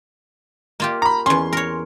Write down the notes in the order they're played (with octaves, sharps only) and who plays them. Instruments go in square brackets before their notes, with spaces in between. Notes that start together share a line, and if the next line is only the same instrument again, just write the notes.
[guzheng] A#3 F4 G4
[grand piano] A#5 B5
[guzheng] E2 C#4 [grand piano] C6
[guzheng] A#4 C#5